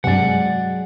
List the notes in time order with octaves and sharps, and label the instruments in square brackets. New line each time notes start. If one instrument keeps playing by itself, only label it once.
[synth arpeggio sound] G2 C3 [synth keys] F#3 G#3 [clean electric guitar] D5 F#5